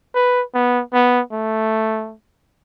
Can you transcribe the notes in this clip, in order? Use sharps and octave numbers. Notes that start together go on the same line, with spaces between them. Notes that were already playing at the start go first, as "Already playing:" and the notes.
B4
B3
B3
A3